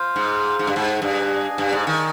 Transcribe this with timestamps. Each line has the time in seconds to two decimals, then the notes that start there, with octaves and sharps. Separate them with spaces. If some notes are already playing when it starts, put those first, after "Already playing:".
Already playing: F4 C5 F5
0.16 G#2
0.59 G#2
0.67 G2
0.76 G#2
1.01 G2 D4 G#4 D#5 G#5
1.58 G2
1.72 G#2
1.87 D#3